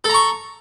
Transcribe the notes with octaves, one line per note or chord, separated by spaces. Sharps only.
A4 A#5 C#6